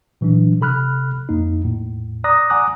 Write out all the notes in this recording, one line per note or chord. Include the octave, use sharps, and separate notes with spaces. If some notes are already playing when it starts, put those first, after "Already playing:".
A#2 E3 F#3 D4
C3 A4 B5 F6 F#6
F2 A#3 D#4
E2 A2
D5 A#5 D6 D#6 F#6 A#6
F#5 G#5 A#5 D6 D#6 F#6